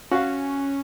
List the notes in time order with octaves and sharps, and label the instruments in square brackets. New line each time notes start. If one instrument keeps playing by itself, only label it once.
[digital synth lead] C#4 [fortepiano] F#4 F5